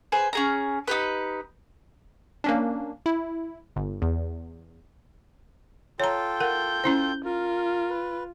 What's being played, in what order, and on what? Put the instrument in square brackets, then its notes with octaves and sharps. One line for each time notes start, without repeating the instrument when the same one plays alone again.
[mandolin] G#4 B4 C5
C#4 G#4 A#5
D#4 G4 B4
[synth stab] A#3 C#4 D4
E4
G1
E2
[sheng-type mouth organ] F4 A4 G5 [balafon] C#5 A#5
[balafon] A#4 F#5 [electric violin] G6
[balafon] C#4 E4 C5
[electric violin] F4 [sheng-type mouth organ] A#4
[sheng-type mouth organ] B4